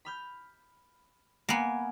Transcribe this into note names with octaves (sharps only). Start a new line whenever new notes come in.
B5 F6 G6
A#3 B3 F#5 G#5